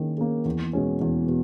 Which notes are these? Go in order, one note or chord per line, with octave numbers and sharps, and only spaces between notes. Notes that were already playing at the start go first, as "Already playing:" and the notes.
Already playing: D#3 A#3 C#4 G#4
A#3 C#4 G#4
E2
B2 G#3 C#4
E2
B2